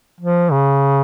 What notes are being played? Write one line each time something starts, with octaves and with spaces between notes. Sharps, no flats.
F3
C#3